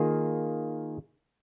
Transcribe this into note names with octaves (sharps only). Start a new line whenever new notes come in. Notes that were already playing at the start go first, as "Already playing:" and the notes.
Already playing: D#3 A#3 F4 G#4